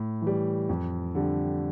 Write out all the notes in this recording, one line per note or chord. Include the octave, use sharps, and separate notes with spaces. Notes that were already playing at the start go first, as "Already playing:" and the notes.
Already playing: A2
E3
G3
F2
D3 G3